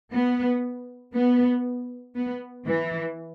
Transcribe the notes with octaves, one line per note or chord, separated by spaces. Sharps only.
B3
B3
B3
E3